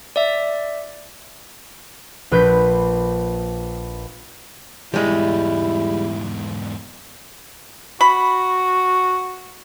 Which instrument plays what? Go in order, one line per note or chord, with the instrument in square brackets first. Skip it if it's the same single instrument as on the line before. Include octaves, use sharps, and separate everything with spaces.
[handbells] D5 E5
[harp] A#1 B4 G6 B6
[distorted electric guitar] E2 G#2 [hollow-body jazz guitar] G3 G#3 [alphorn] E4
[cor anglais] F#4 [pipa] B5